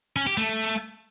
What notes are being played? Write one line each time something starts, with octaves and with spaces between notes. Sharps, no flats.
C#4
G4
A3